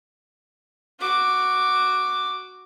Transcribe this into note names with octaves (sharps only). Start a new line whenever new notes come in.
F#4 D6